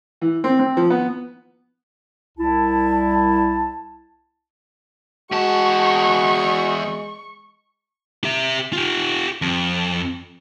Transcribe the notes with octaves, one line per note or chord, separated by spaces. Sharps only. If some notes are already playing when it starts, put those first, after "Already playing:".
E3
C4
C4
F3
B3
C2 E4 A5
E2 G#3 F#4 A5 C#6
G4 E5
F4 G4
F2